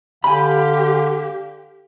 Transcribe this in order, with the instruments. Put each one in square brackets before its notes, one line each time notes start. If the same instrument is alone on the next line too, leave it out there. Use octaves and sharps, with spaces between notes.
[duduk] D3 [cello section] G4 [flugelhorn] F5 [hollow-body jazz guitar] G#5 B5